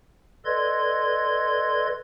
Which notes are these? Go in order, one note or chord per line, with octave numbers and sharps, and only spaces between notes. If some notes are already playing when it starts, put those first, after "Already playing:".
A4 B4 D5 D#5 C6 G#6